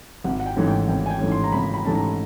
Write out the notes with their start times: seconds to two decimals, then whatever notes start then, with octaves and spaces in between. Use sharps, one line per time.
0.24 G#1 F#5
0.40 F#5
0.46 G5
0.56 G#2 E3 A3 C#4
0.68 G5
0.88 G#1 G5
1.06 G#5
1.10 G5
1.20 G#2 E3 A3 C#4
1.32 C6
1.44 A#5
1.52 G#1 B5
1.74 B5
1.84 G#2 E3 A3 C#4 A5
1.95 A#5